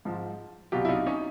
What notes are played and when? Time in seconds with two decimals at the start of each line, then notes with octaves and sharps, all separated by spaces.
0.05 G#2 F3
0.72 C2 B2 F#3 F4 G4
0.85 E4
0.89 D#4 F4
1.06 C#4 D#4